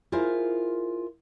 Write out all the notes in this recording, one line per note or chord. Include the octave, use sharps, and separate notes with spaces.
E4 F4 G#4 A#4 C5